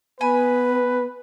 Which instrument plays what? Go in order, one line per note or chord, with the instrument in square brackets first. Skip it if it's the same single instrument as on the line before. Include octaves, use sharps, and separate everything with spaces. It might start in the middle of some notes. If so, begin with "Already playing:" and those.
[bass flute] B3 [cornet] B4 [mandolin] G#5 B5